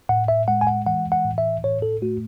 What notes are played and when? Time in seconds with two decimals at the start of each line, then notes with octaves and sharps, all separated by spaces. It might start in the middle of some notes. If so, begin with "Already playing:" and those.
0.09 A2 F#5
0.28 E5
0.48 G#3 F#5
0.61 G#5
0.67 F#5
0.86 E3 F#5
1.12 F#5
1.25 A2
1.38 E5
1.64 A2 C#5
1.82 A4
2.02 A3 F#4